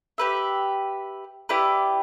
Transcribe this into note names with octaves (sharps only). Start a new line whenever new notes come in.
G4 B4 E5
E4 G4 B4 D5